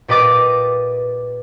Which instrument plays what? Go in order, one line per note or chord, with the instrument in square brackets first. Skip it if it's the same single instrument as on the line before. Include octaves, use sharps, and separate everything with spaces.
[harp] A#2 G4 B4 D#5 D6 A6